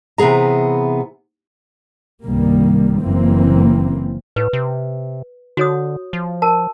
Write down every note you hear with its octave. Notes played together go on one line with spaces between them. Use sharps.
C3 E3 B3 G#4 A#5
C2 G2 D#3 G3 A#3
F#1 E3 A#3 C4
A2 B4
C3
D3 F#4 C#5 D#6
F3
A#4 A5